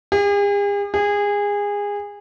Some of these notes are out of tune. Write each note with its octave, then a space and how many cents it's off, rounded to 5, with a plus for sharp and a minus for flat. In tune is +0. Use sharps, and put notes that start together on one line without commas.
G#4 -45
G#4 -25